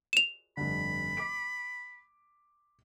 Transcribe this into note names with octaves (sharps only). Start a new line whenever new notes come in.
E7 F7
F1 G2 D3 B5
D6 B6 D7